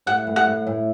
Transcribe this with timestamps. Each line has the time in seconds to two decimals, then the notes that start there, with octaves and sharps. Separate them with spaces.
0.06 A2 F#5
0.27 A2
0.36 F#5
0.47 A2
0.67 A2